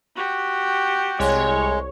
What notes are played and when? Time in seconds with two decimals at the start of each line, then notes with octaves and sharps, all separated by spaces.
0.16 F#4 G4
1.19 C2 G#3 C#5